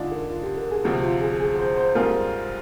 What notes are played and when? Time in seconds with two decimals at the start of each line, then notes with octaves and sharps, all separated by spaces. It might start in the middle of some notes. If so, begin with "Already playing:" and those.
Already playing: D3 G#3 D4 D#4 F4
0.11 A#4
0.30 F4
0.43 G4
0.57 A#4
0.71 G#4
0.85 D2 C3 F3 G4
1.03 F4
1.21 G#4
1.40 G#4
1.59 C5
1.77 C5
1.95 G#2 G3 C4 F4 G#4 A#4